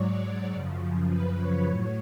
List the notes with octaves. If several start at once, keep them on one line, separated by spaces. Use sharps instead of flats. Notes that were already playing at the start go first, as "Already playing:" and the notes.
Already playing: G#2 F#3 C#5 D5
C#5
F#2 C#3 F3
B4
C#5
A2 F#3 C#5